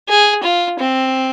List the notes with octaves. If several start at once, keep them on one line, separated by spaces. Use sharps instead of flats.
G#4
F4
C4